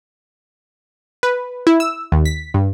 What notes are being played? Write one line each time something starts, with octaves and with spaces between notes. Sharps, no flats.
B4
E4
E6
D#2
B6
G2